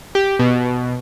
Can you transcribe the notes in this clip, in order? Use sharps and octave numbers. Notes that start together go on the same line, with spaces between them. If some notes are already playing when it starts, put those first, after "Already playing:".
G4
B2